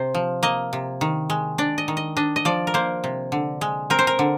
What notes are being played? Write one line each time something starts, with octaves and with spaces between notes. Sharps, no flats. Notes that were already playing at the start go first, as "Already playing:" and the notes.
Already playing: C3 C5
F3
A#3 D#5
C3
D#3
G#3
D4 D5
D#5
D#3
D#5
D4 D#5
D#5
F3 D5
A#4
A#3 C5
C3
D3
G#3
C4 A#4
C5
A#4
D3